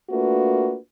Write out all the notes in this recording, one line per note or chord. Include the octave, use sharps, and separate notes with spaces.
A3 A#3 D4 F4 F#4 B4